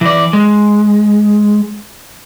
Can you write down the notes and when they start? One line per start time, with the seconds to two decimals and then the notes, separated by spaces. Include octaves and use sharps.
0.01 E3 D5
0.33 G#3